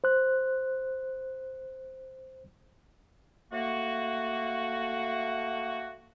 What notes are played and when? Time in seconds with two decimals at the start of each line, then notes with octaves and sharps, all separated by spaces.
0.04 C5 F#6
3.52 A3 A#3 F#4